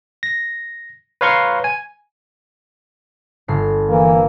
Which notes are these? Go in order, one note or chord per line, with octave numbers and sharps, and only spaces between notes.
A#6
B4 C#5 F5 A#5 C6 C#6
G#5
G1 C7
E3 A#3